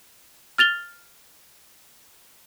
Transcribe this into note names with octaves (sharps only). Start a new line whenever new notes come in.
F6 A6 F7 G7